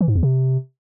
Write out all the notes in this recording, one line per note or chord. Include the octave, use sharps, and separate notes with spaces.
E3
G#2
E2
C3